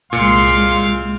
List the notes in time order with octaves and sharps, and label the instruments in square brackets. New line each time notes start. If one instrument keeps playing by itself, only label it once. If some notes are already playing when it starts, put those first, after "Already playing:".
[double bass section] C2 G#3 [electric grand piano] A#2 C#7 [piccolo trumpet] F5 [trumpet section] C6